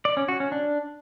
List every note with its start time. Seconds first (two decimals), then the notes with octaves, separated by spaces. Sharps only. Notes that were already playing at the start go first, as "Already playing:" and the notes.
0.05 D5
0.17 C#4
0.28 F#4
0.40 C#4
0.52 D4